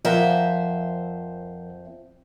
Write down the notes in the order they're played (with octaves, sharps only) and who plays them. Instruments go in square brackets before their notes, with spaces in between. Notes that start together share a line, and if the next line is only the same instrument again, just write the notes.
[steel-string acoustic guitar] F2 C5 E5 [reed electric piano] F3 A#4 F#5